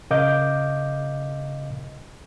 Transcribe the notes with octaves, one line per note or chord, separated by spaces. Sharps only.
C#3 A#4 D#5 F5 D6 G6